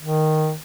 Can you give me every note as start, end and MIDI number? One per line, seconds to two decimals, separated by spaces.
0.01 0.55 51